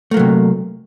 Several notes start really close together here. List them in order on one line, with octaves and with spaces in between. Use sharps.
A3 A#3 F#3 C3